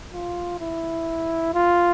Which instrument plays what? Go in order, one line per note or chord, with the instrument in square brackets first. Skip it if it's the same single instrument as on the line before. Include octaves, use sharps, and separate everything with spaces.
[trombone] F4
E4
F4